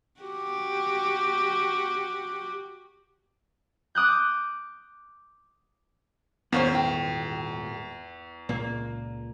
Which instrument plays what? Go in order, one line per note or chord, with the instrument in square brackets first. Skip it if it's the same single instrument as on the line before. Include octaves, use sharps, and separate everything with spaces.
[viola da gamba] F#4 G4
[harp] D6 D#6 F#6 G6
[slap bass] D#1 G#1 B3 [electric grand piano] E2 [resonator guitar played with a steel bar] A#3 C#4 C5
[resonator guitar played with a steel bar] G5
[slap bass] C#2 A#2 [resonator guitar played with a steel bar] A#3